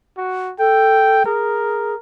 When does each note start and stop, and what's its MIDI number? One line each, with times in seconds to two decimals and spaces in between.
0.17 0.53 66
0.59 1.23 69
0.59 1.22 79
1.26 1.95 68
1.26 1.99 70